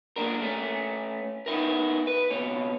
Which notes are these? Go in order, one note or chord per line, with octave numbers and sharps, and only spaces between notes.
G#3 A#3 D4 A#4
A3 C#4
B3 D#4 E4 A#4
B4
C#2 B2 C#5